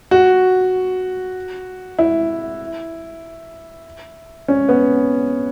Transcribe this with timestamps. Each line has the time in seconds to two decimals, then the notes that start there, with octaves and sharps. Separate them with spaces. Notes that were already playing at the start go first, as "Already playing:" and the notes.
0.11 F#4
1.99 E4
4.48 C#4
4.69 B3